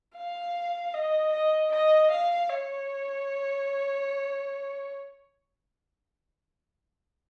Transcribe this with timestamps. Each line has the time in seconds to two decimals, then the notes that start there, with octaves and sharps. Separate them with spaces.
0.16 F5
0.94 D#5
1.33 D#5
1.72 D#5
2.11 F5
2.50 C#5